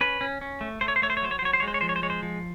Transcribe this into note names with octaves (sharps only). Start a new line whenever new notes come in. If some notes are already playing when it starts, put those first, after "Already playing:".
C#4 B4
C#4
C#4
A3
A3 C5
C#5
C5
A3 C#5
C5
C#5
F#3 C5
C#5
C5
F#3 C#5
C5
G#3 C#5
C5
C#5
F3 C5
C#5
C5
G#3 C#5
C5
F3